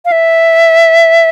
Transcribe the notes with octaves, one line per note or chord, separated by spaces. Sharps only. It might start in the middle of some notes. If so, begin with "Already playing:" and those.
F5
E5